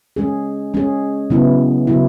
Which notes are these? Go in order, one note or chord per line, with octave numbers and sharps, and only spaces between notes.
G#3 C#4 G#4
G#3 C#4 G#4
C#3 F#3 B3 E4
C#3 F#3 B3 E4